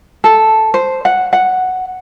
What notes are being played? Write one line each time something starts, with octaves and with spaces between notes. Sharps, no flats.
A4
C5
F#5
F#5